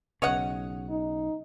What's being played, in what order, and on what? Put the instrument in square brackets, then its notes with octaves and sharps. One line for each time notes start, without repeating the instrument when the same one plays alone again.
[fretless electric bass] B1 C#3 [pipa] C#5 D#5 F#5
[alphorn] D#4